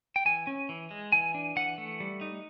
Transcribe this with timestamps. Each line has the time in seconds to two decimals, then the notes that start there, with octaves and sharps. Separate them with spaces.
0.16 G5
0.25 E3 G#5
0.47 C#4
0.69 E3
0.91 G#3
1.12 E3 G#5
1.35 D4
1.56 E3 F#5
1.78 A3
2.00 G3
2.21 D#4